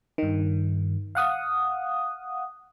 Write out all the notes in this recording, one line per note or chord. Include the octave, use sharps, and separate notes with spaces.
G2 D#3
F5 F#5 D#6